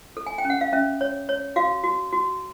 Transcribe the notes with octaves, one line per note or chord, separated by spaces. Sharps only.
A4
G#5
G5
C#4
F#5
F5
C#4 E5
C#5
C#5
F#4 F5
F#4
F#4